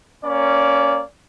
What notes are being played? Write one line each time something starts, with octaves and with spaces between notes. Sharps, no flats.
A#3 C#4 D5